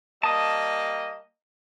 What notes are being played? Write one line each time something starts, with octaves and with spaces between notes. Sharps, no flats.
G3 A#3 D#5 A5 D#6